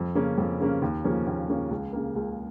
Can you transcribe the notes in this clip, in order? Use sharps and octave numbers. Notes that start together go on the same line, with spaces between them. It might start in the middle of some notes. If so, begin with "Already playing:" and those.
Already playing: F2
C#3 A#3 C#4
F2
C#3 A#3 C#4
D#2
C#3 F3 A#3 C#4
D#2
C#3 F3 A#3 C#4
C#2
C#3 A#3
C#2